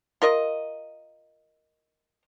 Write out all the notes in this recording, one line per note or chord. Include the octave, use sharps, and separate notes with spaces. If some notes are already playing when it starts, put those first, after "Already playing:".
F4 A#4 D#5